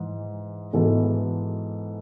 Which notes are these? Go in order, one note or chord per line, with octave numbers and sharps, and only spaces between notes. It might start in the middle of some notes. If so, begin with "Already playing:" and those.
Already playing: G#2 E3
G#2 E3 B3 F#4 A4